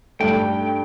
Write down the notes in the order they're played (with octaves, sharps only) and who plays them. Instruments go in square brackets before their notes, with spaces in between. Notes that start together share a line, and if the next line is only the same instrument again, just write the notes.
[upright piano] G2 D3 A3 [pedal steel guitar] G5